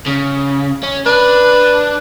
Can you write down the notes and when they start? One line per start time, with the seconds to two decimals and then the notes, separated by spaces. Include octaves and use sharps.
0.08 C#3
0.83 C#4
1.06 D4 B4